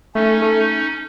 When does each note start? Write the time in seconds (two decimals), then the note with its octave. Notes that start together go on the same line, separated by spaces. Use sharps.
0.15 A3 C#4 D#4
0.42 A3